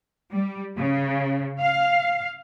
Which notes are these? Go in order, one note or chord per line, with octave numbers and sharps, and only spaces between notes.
G3
C#3
F5